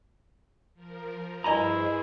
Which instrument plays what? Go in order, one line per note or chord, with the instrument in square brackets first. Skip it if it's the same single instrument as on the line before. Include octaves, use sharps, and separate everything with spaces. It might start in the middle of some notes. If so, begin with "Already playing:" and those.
[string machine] F3 A#4
[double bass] G2 [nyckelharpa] E4 [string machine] G#4 C5 [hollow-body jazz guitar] D#5 G#5 A#5